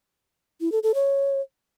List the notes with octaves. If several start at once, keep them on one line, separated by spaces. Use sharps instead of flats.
E4
A4
A4
C#5